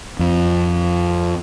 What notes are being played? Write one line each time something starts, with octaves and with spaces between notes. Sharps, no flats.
F2